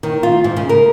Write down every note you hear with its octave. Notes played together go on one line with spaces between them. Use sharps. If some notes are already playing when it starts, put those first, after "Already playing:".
D#3
F4
G#2
C#3
A#4